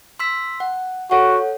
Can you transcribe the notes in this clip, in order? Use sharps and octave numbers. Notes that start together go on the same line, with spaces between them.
C6 E6 B6
F#5
F#4 A4 C#5 F#5